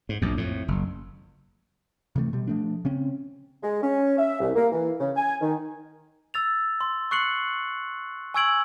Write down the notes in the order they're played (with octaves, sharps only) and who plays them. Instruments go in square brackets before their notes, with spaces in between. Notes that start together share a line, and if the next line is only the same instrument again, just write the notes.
[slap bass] G#2
A#1 F#2
F2 A2
F#1
[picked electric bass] C3 E3 G#3 A3
B2 G3
F3 A3 D4
C#3 C4 C#4
[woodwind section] G#3
C#4
E5
C2
A#3
E3
C#3
G#5
D#3
[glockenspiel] E6 A6 F7
C6
C#6 F#6 C7 C#7 F#7
G#5 C#6 E6 G#6 D7 F#7